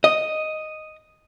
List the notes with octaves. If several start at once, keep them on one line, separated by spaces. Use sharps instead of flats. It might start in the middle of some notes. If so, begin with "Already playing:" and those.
D#5